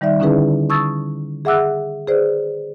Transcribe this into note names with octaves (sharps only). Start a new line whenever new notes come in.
D#3 G3 D#4 D5 E5
D3 C#4 D#4 E4 G#4 B4
A5 C#6 D#6 E6 G#6 A6
G#4 E5 F#5 D6 E6 F#6
G#4 B4 C5 D5